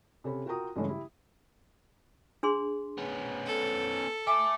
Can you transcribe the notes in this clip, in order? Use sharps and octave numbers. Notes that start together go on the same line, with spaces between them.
C3 C#4 A4 B5
F4 F#4 A#4 G5 A#5 D#6
G2 C#3 E3 G#3 A3 C#4
E4 G4
D4 G#4 C6
B3 C#4
A4
E5 G#5 A5 D6